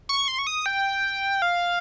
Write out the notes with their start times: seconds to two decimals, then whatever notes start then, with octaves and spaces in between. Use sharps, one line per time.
0.09 C#6
0.28 C6
0.39 C#6
0.47 D#6
0.66 G5
1.42 F5